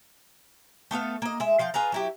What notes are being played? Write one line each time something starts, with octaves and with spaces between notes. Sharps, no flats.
A3 B3 A4 F5
A#3 D#5
G#3 E5
F3 F5 G5
F4 G#4 B4 A#5
F#3 E4 G4